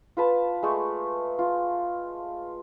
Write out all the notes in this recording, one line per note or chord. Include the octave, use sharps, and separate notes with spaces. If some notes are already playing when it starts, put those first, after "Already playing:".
F4 B4 A5
G#3 A3
F4